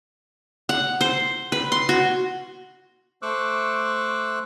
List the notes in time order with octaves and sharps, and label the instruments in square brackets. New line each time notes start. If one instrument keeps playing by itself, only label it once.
[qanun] F#5
C5
B4
C6
F#4
[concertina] A3 C5 C#6 D6 E6 F#6